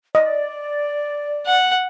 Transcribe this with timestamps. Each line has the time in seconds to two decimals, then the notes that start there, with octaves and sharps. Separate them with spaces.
0.15 D5 D#5
1.46 F#5